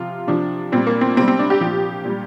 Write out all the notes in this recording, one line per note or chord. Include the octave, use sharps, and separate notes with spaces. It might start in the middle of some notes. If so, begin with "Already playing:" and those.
Already playing: C3 F3 F4
C3 F3 D4
A#2 G3 C4
A#3
C4
C3 C4
G3
C4
D4
G4
A#2 F3
A#2 G3